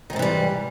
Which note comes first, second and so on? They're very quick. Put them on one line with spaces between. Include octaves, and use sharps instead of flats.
D#3 G#2 C3 E3 G3